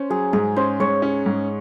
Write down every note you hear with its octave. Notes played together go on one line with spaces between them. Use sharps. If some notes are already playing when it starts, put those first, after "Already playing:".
Already playing: C#4 C5
F#3 G#4
G#2 G#4
C#4 C5
G#2 C#5
C#4
G#2